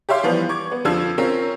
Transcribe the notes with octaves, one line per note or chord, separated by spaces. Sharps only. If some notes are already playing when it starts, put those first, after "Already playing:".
G4 C#5 E5 F5 C6
E3 F3 G3 B3
C#6 D6 G#6
B3
F2 D3 F3 F4 E6 G#6
C4 C#4 F4 A#4 C#5